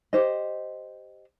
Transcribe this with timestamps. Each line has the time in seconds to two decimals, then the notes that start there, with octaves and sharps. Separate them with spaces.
0.13 G4 C5 D#5